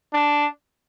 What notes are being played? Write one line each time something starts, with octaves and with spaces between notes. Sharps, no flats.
D4